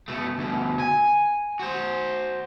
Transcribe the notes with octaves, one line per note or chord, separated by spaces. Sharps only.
B2 A3
D2 B2
G#5
F#4 C5